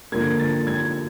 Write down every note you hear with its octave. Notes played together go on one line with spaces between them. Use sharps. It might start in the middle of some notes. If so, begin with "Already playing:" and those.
D3 F3 A#3 G#6
A6
G#6